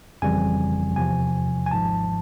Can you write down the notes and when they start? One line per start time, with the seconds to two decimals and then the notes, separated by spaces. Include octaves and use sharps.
0.22 G1 F2 C#3 E3 G3 G#5
0.96 E2 C3 F3 G#5
1.66 G#5
1.71 G#1 G#2 F3 A5